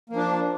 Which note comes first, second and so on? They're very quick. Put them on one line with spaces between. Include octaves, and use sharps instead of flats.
A#3 F3 D4